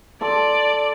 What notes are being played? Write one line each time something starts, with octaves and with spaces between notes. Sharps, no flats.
A4 D5 C6 D6